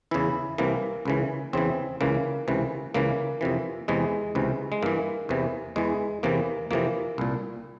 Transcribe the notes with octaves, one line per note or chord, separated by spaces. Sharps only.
E2 C#3 E3 E4
C2 C3 E3 A#3
C#2 C#3 E3
E2 C#3 E3 C4
C#2 C#3 E3 A#3
C#2 C3 E3
C#2 C#3 E3 A#3
F2 C3 E3
E2 C3 E3 G#3
C#2 C3 E3
G#3
G2 E3 A#3
E2 C3 E3
E2 E3 G#3
E2 C3 E3 A#3
F2 C3 E3 A#3
C2 A#2